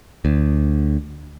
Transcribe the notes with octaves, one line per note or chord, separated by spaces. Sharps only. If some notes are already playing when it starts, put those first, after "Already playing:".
D2